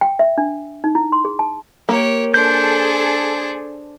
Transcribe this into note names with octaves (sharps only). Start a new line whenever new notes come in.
G5
E5
D4
D#4
E4
C6
G#4
A5
A#3 G4 C#5
D4 G#4 A4 C5 G6